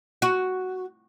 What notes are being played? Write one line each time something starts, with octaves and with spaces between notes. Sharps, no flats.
F#4